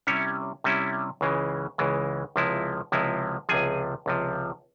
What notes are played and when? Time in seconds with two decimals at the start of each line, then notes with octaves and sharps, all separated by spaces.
0.07 C3 G3 C#4 E4 C#5
0.64 C3 G3 C#4 E4
1.21 C#2 C#3 E3 G#3
1.78 C#2 C#3 E3 G#3
2.36 C#2 C3 F3 G#3 E4
2.92 C#2 C3 F3 G#3 E4
3.49 C#2 C3 F3 G#4 G#5
4.06 C#2 C3 F3